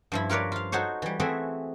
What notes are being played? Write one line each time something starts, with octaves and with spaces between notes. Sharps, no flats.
G2 F3 E4
F4 A#4 B4 C#5 D5
F4 F5
D#4 F#4 A4 C5 C#5
E3 G3
E3 A3 C4 F#4 G#4 E5